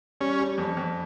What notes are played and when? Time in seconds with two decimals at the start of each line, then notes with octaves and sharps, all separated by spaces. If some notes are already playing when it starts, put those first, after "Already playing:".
0.20 G3 C#4
0.39 G3
0.58 F2
0.77 F2